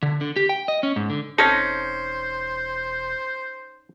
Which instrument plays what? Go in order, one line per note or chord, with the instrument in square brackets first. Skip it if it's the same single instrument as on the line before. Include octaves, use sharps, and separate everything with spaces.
[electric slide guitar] D3
D3
G4
G5
D#5
C#4
G#2
D3
[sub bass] E1 [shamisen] C4 A4 [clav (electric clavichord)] C#4 D#4 [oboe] C5